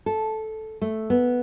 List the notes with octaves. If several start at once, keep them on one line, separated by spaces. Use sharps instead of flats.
A4
A3
B3